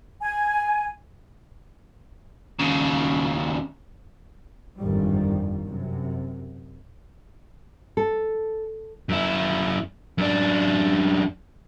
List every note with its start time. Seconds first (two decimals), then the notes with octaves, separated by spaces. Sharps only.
0.21 G#5
2.59 D#2 C#3
4.78 G1 F2 G#2 D#3 G3
5.62 F#2 C3
7.97 A4
9.09 F#2 E4
10.18 F#2 D4